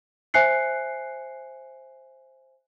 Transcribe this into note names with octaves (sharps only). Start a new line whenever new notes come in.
C5 E5 G#5 F#6 C7 C#7